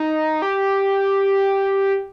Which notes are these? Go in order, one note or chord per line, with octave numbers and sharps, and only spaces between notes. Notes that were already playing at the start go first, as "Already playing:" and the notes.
Already playing: D#4
G4